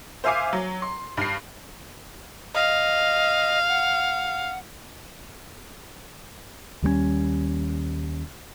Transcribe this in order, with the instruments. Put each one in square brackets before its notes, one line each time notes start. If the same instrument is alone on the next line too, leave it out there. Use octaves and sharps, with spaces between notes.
[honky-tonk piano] C5 E5 F5 G#5 D6 C7
F#3
C6
G2 C7
[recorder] D#5 [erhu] F5
[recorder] F#5
[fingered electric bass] D#2 G3 A3 C#4